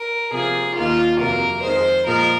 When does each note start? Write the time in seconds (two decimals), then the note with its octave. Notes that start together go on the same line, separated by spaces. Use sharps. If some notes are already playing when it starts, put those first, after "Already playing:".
Already playing: A#4
0.33 C3 F3 A#3 G#4
0.76 D#2 D#3 A#3 F4
1.19 F2 C3 F#3 A#3 A#4
1.62 F2 D#3 G#3 C5
2.06 A#2 F3 G#3 A#4